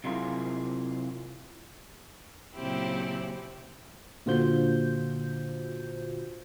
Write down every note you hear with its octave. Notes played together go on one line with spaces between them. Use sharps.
C3 F#3 E4 F4 G#4 A#4
A#2 C#3 F#3 C4 E4 G4
A#2 D3 F4 F#4 C5 G6